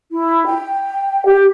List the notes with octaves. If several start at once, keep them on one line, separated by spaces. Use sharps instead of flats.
E4
G5
G4